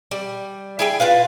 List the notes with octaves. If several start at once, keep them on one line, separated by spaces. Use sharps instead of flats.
G3
E4 G#4 G5
F4 B4 F5